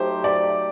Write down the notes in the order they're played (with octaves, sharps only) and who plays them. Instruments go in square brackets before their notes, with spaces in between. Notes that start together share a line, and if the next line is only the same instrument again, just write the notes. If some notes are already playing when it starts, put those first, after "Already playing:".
Already playing: [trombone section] F#3 A3 D#4 G4 [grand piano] C5
[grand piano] D5